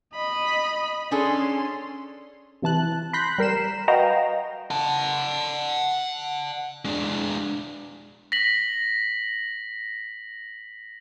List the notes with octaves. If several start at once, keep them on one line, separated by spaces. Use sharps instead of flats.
D#5 B5
C#4 D4 G#4 A4 C6
C3 E3 A5 F#6
B5 C6 F#6 G6 A#6 B6
G3 A#4 C7 E7
F#4 B4 D#5 F5 G5 A#5
F#5 A5
G#3 D4
A#6 B6 F#7